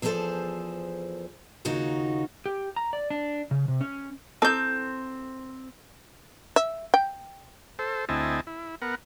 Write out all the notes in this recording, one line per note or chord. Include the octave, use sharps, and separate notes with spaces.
E2 F3 C#4 G#4 A4 C5
D#2 C#3 D#4 F4 F#4
G4
A#5
D5
D4
C#3
C3
C#4
C4 E4 A4 A5 G6
E5
G5
A4 C5
D2 C4 E4 D#5 G#5 A5
E4
B3 A#4 F#5